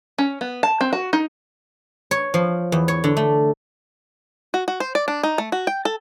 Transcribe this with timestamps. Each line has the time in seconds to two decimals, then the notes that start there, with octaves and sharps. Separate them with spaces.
0.18 C#4
0.41 B3
0.63 A5
0.81 C4
0.93 F#4
1.13 D#4
2.11 C#5
2.34 F3
2.72 E2
2.88 C#5
3.04 D3
3.17 A3
4.54 F#4
4.68 F#4
4.80 C5
4.95 D5
5.08 D4
5.23 D#4
5.38 A3
5.52 F#4
5.67 G5
5.85 A4